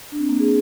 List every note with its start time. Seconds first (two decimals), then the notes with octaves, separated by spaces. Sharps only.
0.12 D4
0.18 C4
0.29 A#3
0.40 G#4